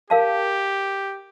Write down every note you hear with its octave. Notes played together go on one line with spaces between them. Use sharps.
G4 A#4 F5 A5